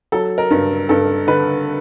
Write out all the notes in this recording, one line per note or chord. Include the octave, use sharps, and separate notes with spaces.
F#3 A4
A#4
G2
G2 A4
D3 B4